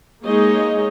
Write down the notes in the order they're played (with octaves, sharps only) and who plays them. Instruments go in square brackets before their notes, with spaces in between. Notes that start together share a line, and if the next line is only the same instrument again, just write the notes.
[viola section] G#3 A#3 D#4 G#4 C#5 D#5